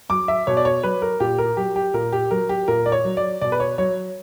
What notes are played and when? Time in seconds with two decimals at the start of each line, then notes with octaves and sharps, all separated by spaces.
0.09 F#3 D6
0.28 E5
0.47 B2 C#5
0.57 D5
0.65 C#5
0.83 F#3 B4
1.02 A#4
1.20 A#2 G4
1.38 A#4
1.57 F#3 G4
1.76 G4
1.94 A#2 A#4
2.13 G4
2.31 F#3 A#4
2.49 G4
2.68 A#2 A#4
2.86 D5
2.92 C#5
3.04 F#3
3.17 D5
3.41 B2 D5
3.52 B4
3.60 C#5
3.78 F#3 C#5